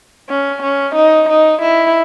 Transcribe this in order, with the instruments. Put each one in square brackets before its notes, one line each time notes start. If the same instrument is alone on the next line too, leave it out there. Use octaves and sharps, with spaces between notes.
[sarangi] C#4
C#4
D#4
D#4
E4